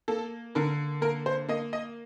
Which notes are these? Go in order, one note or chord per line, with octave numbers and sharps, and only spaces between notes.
A#3 A4
D3 A#4
A#3 A#4
C5
A#3 D#5
D#5